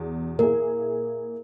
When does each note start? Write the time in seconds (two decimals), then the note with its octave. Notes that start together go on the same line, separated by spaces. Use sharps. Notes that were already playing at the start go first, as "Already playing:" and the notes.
Already playing: E2 B2 G#4
0.38 A#2 A#3 E4 G#4 A#4